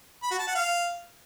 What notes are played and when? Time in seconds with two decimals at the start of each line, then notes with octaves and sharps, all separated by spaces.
0.23 B5
0.31 F#4
0.39 A5
0.47 F#5
0.55 F5